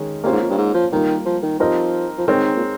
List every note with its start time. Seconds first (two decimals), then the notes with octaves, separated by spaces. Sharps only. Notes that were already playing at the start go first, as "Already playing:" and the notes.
Already playing: D#3 G#3 C#4
0.24 C3 A#3 C#4 F4 C5
0.32 G#2
0.42 F2
0.50 G2
0.58 G#2
0.74 F3
0.92 D#3 G3 A#3 F4
1.26 F3
1.43 D#3
1.59 F3 C4 D#4 G4 A#4 D#5
2.18 F3
2.28 D#3 G#3 C4 D#4 A#4 C#5
2.56 A#2